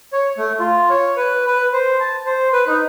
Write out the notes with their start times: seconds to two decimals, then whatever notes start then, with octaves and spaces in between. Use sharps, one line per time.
0.13 C#5
0.38 A3
0.60 F4
0.90 C#5
1.17 B4
1.47 B4
1.73 C5
2.00 A5
2.26 C5
2.53 B4
2.67 D#4